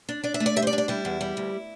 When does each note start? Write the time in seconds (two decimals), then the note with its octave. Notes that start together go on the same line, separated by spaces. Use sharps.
0.09 D4
0.24 D4 D5
0.34 E5
0.40 A3
0.46 D5
0.56 G3 E5
0.62 C5
0.67 D5
0.73 D4
0.78 D5
0.88 G3 E4
1.05 E2
1.21 G3
1.37 D2